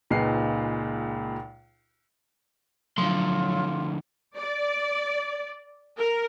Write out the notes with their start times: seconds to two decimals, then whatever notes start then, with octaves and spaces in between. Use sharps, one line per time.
0.11 C#2 A#2 G#3 D#4 B4 C7
2.98 D3 F3 F#3 A3 F4 C6
4.36 D5
5.97 A#4